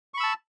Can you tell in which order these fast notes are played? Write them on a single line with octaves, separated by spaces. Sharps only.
C#6 B5 E6 A5